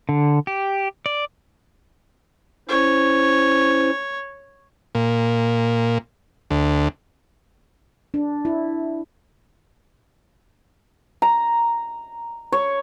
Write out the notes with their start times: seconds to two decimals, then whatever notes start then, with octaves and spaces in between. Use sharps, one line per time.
0.09 D3
0.47 G4
1.06 D5
2.69 C#4 E4 C5 C#5
4.95 A#2
6.51 D2
8.14 D4
8.45 E4
11.22 A#5
12.52 C#5